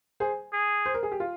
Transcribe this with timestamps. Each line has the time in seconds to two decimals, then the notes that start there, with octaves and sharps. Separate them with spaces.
0.20 G#4 C5
0.53 G#4
0.86 C5
0.94 A#4
1.03 G#4
1.12 G4
1.20 F4